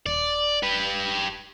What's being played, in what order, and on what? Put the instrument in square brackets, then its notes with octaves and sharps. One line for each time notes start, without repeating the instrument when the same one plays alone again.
[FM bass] D#1 [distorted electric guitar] D5
[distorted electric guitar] G4 B4